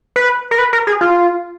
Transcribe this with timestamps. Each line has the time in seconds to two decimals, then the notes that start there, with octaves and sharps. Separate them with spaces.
0.16 B4
0.51 A#4
0.59 B4
0.73 A#4
0.87 G#4
1.01 F4